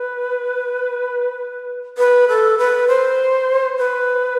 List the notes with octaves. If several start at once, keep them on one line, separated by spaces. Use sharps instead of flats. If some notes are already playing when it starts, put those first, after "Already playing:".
Already playing: B4
B4
A4
B4
C5
B4